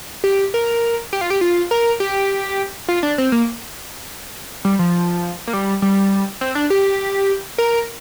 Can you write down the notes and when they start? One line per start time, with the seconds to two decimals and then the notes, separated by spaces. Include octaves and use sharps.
0.24 G4
0.54 A#4
1.13 G4
1.21 F4
1.30 G4
1.41 F4
1.71 A#4
2.00 G4
2.88 F4
3.03 D4
3.18 C4
3.32 A#3
4.65 G3
4.79 F3
5.47 A#3
5.53 G3
5.82 G3
6.41 C4
6.55 D4
6.70 G4
7.58 A#4